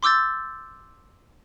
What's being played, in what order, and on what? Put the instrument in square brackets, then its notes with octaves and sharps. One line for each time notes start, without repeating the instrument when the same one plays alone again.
[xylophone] C6 D6 E6 G6 A6